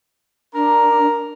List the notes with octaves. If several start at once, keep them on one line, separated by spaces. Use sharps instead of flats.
D4 A#4 A#5